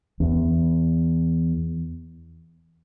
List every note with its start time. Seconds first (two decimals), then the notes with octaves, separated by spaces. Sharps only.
0.20 E2